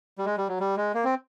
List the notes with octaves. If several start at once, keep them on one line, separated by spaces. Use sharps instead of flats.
G3
G#3
G3
F#3
G3
G#3
A#3
C4